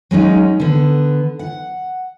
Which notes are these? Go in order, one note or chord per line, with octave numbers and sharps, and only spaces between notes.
F#3 G#3 C#4 D#4
D3 B3
F#5